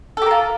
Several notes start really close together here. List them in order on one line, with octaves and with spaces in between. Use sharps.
A4 G4 A#4 F4